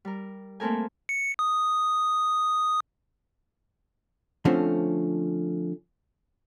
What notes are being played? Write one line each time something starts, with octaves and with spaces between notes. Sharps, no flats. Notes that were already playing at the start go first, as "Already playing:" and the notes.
G3 A#4
A3 A#3 C4 A4 A#4 G#5
C#7
D#6
D3 F3 A3 C4 C#4